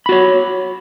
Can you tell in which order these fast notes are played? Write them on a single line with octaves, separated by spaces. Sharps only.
B5 F#4 C#5